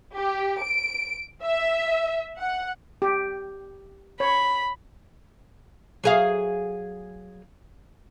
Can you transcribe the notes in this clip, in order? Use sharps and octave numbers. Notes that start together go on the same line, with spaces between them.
G4
D7
E5
F#5
G4
C#5 B5
F#3 G#4 F5